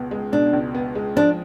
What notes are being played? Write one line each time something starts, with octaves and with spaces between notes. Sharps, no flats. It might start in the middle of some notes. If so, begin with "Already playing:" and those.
Already playing: C#2 B2 B3
G#3
B2 D4
C#2
B3
G#3
F3 D4